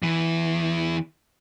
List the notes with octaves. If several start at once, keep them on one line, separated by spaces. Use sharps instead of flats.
E2 E3